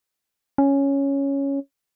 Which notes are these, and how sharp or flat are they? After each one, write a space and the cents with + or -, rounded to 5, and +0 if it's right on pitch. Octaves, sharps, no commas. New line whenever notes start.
C#4 +0